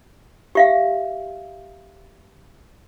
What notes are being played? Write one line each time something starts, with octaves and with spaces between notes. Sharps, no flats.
G4 E5 F5